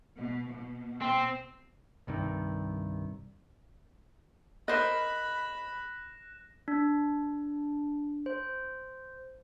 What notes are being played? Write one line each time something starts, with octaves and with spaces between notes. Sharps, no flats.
B2
B2
C4
C2 G2 C3 D#3
A#4 C5 D#5 B5 F#6 A#6 E7
D4
C5